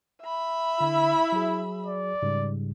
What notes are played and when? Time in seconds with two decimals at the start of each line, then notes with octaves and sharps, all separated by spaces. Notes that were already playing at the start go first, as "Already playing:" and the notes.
0.23 E5 B5
0.81 D3 E4
1.32 F#3 G#4
1.87 D5
2.22 G#2 C#3 G3